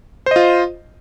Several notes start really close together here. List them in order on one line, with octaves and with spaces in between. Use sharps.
C5 D#5 F4